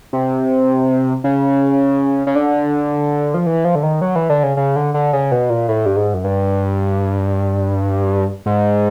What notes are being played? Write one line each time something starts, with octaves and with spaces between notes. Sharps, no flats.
C3
C#3
C#3
D3
F3
E3
F3
D3
D#3
F#3
E3
D3
C#3
C#3
D3
D3
C#3
B2
A#2
A2
G2
G#2
F#2
G2
G#2